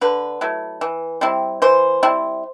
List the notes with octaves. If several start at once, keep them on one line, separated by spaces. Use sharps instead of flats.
D3 B4
F#3 A3 E4
E3
G3 C4 E4
E3 C5
G3 C4 E4